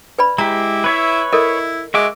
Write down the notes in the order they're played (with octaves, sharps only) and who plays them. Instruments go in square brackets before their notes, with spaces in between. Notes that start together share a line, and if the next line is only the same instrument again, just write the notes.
[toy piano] B4 D5 B5
[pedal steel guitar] G#3 G4 [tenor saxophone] E4 [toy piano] A#5
[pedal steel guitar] B4 C#5 E5
[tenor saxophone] E4 [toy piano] A4 A#4 D#5
[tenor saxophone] G#3 [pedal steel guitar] F#4 E5 D6